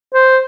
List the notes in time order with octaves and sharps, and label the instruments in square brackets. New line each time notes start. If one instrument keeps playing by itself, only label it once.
[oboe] C5